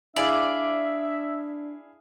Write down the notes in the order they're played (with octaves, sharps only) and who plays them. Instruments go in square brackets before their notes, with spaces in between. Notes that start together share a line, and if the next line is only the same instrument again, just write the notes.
[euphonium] D4 [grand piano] E4 G#4 F5 [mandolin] D5 [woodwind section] E5